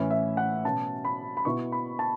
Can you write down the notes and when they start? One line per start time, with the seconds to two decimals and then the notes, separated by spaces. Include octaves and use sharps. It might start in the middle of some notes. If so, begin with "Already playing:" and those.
Already playing: A2 E3 C#4 E4
0.11 E5
0.37 F#5
0.64 B2 F#3 C#4 A5
1.05 B5
1.37 B5
1.45 B2 B3 E4 C#6
1.72 B5
1.99 A5